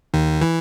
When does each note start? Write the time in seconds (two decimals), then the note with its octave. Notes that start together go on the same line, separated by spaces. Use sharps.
0.14 D#2 D#3
0.41 E3